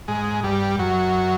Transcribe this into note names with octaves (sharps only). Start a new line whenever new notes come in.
G#2 G#3
G2 G3
F#2 F#3